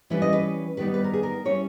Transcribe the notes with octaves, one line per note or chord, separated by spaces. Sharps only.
E3 G3 C#4 E4 B4
D#5
B4
D#3 G3 B3 D#4 B4
B4
A#4
G#4
A#4
G3 C#4 E4 C#5